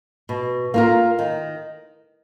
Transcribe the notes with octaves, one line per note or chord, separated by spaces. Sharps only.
B2
A#3 F4 A#4
D#3